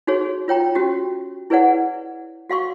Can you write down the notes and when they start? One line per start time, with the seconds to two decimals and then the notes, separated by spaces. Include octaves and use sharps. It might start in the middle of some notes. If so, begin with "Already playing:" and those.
0.07 D#4 F#4 G#4 C#5
0.48 F4 C#5 G5 A#5
0.75 C#4 F#4 G4
1.50 E4 G#4 B4 C#5 D5 F#5
2.50 F#4 F5 C6 C#6